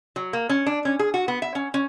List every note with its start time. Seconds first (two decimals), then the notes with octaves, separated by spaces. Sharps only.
0.16 F#3
0.33 A#3
0.49 C#4
0.66 D4
0.85 C#4
0.99 G#4
1.14 F#4
1.28 B3
1.42 E5
1.55 C#4
1.74 C#4